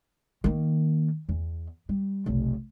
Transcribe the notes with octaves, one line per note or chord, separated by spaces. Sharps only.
D#3 A#3
E2
G3
F1 B1